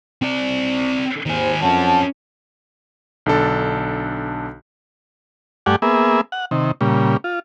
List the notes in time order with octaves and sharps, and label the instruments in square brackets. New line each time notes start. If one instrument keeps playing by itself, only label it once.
[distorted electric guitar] C4 D5
[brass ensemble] D#2 C5 [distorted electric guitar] D#3 G#4
[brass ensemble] F2 C#5 A5 [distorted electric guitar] C#4 F#4
[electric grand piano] B1 D3 D4 A4
[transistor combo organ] G2 A3 G4 D5 F#5 G#5
A#3 B3 G#4 E5
F#5
C3 D#3
A#2 C#3 G3
F4